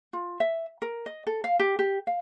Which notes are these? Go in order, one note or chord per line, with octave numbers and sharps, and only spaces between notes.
F4
E5
A#4
D#5
A4
F5
G4
G4
F5